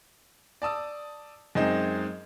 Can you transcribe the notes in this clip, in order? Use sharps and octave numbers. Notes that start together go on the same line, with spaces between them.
D5 A5 D#6 E6
F#2 G#3 C4 D#4